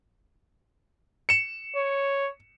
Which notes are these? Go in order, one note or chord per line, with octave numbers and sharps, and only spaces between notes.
C#7 E7
C#5